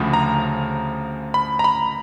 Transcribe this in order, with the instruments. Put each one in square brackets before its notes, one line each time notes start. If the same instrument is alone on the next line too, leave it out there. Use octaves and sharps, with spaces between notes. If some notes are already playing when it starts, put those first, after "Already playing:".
Already playing: [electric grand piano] D2 C#3 F3 B5
A#5
B5
A#5
B5